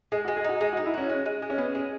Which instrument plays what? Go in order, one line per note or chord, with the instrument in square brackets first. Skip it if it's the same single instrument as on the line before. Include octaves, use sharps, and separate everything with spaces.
[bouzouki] G#3 [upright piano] G#4
[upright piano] F#4
[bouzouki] G#3
[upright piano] G#4
[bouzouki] D#4 [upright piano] F#4
[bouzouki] G#3 [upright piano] G#4
[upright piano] F#4
[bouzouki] D#4
[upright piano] E4
[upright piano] C#4 [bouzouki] F#4
[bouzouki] G#3
G#3
G#3
[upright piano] C#4
[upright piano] B3 [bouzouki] G#4
[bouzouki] G#3 [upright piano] C#4